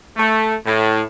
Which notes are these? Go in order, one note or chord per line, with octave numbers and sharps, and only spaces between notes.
A3
A2